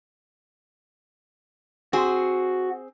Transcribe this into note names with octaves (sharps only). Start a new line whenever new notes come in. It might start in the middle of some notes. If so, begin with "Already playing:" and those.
C4 F#4 G#4